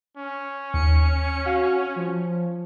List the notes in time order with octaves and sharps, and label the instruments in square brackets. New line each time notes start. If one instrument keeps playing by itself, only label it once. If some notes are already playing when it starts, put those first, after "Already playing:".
[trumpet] C#4
[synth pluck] D#2 [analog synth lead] C#7
[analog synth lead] F#4 [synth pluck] F5
[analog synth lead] F3